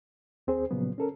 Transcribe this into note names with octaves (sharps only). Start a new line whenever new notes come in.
D#2 C4 G#4 C5
A#2 C#3 F3 F#3 B3
C#4 A4 A#4